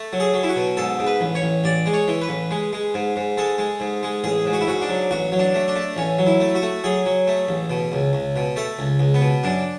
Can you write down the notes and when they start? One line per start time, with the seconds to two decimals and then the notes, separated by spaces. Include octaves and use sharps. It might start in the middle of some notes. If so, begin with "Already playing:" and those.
Already playing: A3
0.13 F#3
0.20 G#4
0.34 F#3
0.43 E4
0.49 F#4
0.56 B2
0.77 G#2 A4
0.99 G#2
1.07 B4
1.21 A1
1.35 C#5
1.42 A1
1.64 A1 D5
1.86 G#3
1.94 C#5
2.08 E3
2.22 B4
2.29 A1
2.51 G#3
2.73 G#3
2.94 G#2
3.16 G#2
3.37 G#3 A4
3.58 G#3
3.80 G#2
4.03 G#3
4.24 A1 G#4
4.46 G#2
4.53 F#4
4.61 E4
4.67 G#2 F#4
4.82 D4
4.89 F#3
5.11 A1 F#4
5.32 F#3
5.39 D4
5.54 A3
5.68 D4
5.76 A3
5.97 A1 C#4
6.19 F#3
6.27 E4
6.40 A3
6.55 F#4
6.62 A3
6.84 F#3 G#4
7.06 F#3
7.27 A3
7.49 A1
7.70 B2
7.92 C#2
8.13 C#2
8.36 B2
8.56 A3 A4
8.79 C#2
8.99 C#2
9.14 B3
9.21 B2
9.44 F#2 D4